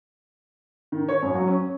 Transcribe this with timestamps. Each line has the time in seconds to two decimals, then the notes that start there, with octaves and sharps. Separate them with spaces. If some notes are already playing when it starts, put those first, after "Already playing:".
0.92 D#3
1.09 C#5
1.23 F#2
1.35 F#3
1.48 C#4